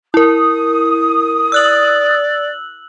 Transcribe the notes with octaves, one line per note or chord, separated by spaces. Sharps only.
E4 A#4 D#6
D5 E6 F#6 F#7